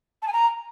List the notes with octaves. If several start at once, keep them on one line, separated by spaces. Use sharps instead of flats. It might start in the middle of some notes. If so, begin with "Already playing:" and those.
A5
G#5
A#5